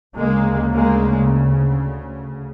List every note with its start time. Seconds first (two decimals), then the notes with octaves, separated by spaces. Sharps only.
0.16 D2 C#3 G#3 A#3
0.74 G#3 A#3